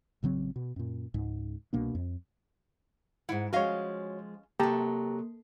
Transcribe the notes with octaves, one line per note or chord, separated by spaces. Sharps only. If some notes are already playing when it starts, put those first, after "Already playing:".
A1 C#3 F#3 C4
B2
F#2 A#2
C#2 G#2
C2 B2 A#3 D4
F2
G#2 D#3 E4 F#5
F3 G#3 C#4 F#4 C#5 D#5 F5
C3 F#3 A#3 G4 A4 A5 A#5